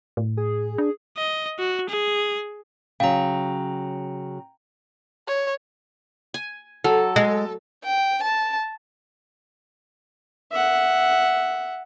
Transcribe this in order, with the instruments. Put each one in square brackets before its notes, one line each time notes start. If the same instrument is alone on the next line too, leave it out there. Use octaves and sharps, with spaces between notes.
[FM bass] A2
[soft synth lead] G#4
[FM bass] D4
[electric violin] D#5
F#4
G#4
[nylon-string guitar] C#3 F#3 [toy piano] F5 [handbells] G5 A#5
[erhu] C#5
[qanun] G#5
[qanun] F#3 [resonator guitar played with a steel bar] A4
[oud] G#3
[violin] G5
A5
[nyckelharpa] E5 F#5